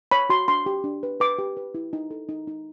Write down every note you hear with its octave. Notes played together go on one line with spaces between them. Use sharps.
C#5 B5
F#4 C6
D4 C6
G4
D4
B4
B4 D6
G4
B4
E4
D#4
A4
D#4
D#4